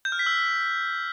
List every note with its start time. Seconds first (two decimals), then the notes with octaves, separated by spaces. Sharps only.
0.05 G6
0.12 F6
0.19 B6
0.26 E6